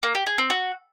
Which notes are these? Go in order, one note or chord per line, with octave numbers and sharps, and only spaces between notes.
A#3
G4
G#4
C4
F#4